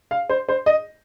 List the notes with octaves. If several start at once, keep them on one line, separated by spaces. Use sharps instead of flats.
F5
C5
C5
D#5